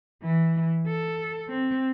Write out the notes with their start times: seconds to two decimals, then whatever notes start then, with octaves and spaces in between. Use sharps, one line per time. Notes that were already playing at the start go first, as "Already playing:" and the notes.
0.23 E3
0.87 A4
1.49 C4